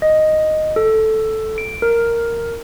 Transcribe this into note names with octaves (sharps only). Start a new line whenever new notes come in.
D#5
A4
D7
A#4